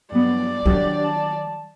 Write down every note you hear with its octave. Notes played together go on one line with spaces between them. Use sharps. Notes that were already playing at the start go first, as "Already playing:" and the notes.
G2 F#3 B3 D5
D#3 F#3 D4 G4
A5